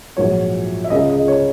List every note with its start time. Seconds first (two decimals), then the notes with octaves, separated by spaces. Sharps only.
0.17 A#1 G#2 F#3 C#5
0.84 E5
0.90 C#2 C#3 G#3 D#5
1.10 D#5
1.28 C#5